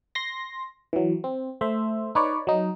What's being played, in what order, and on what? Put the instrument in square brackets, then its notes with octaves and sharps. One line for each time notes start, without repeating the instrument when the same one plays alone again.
[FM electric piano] C6 A#6
E3 F#3
C4
A3 C5 E5
D#4 B4 C#5 D5
F#3 D#4